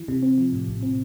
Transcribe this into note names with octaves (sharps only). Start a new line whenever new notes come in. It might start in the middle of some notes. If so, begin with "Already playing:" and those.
Already playing: E3
C3
C4
F3
A2
A#1
C4